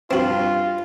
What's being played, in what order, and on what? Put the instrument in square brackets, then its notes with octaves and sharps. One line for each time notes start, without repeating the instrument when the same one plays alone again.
[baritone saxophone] G2 [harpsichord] C4 F#4 [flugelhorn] F4